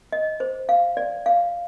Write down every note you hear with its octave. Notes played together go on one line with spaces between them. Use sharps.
D#5
C5
F5
D5
F5